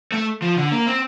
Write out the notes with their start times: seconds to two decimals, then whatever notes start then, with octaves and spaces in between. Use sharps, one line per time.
0.12 A3
0.42 F3
0.57 D3
0.72 A#3
0.87 C4